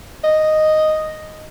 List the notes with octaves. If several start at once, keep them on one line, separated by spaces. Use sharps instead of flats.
D#5